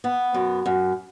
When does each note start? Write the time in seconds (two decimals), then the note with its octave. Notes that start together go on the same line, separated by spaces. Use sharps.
0.04 B3
0.34 F#2
0.66 F#2